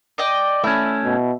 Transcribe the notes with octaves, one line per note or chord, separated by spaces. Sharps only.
D5 D#5 G5
A3 C#4 E4
B2